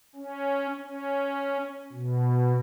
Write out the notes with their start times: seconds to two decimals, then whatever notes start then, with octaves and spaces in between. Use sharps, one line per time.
0.16 C#4
0.79 C#4
1.92 B2